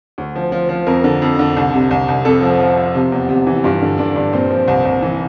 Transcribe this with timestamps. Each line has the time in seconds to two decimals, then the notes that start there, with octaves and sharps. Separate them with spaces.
0.18 D2
0.35 F3
0.52 F3
0.69 F3
0.86 F2 A#4
1.04 D3
1.22 F2
1.39 D3
1.57 C2
1.73 C3
1.91 C2
2.08 C2
2.25 F2 A4
2.42 F3
2.60 F3
2.77 F3
2.95 C3
3.12 E2
3.29 C3
3.47 E3
3.64 G2 F4
3.82 D3
3.98 D3 D4
4.16 G2
4.33 A#2 C4
4.50 F3
4.68 C2
4.85 C2
5.02 E3